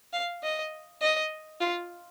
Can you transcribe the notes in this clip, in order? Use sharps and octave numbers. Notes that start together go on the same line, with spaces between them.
F5
D#5
D#5
F4